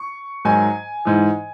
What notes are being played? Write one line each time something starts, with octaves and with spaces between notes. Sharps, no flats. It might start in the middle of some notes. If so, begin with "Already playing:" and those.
Already playing: C#6
G#2 D#3 F#3 G#5
G#2 E3